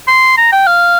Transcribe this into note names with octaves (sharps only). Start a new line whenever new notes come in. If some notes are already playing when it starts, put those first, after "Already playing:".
C6
A#5
G5
F5